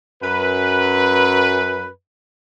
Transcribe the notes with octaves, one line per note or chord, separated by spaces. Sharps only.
F#2 B4